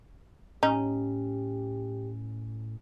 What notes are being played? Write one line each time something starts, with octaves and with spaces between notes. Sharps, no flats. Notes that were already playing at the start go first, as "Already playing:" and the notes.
A2 C#4 D#4 G4